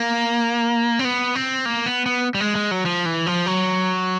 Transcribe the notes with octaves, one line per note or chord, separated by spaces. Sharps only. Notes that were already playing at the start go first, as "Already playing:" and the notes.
Already playing: A#3
C4
B3
C4
A#3
B3
B3
G3
G#3
G#3
F#3
F3
E3
F3
F#3